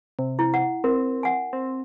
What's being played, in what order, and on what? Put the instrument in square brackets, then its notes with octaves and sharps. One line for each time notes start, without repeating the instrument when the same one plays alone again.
[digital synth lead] C3
[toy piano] E4
F#5
[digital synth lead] C4 [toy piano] A#4
[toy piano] F#5 G#5
[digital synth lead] C4